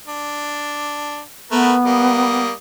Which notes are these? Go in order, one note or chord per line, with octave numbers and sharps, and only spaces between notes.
D4
A3 B3 A#4 B4
G3 A#3 D#6